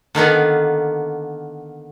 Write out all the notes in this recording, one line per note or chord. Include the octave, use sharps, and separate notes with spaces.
D3 D#3 A#3 B3